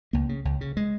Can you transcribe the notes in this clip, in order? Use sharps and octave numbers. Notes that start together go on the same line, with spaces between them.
C#2 A#3
C#3
C#2
C#3
G#3